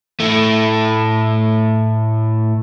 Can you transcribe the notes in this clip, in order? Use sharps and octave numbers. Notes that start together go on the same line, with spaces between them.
A2 A3